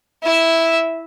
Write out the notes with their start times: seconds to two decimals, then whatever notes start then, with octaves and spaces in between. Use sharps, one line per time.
0.24 E4 E5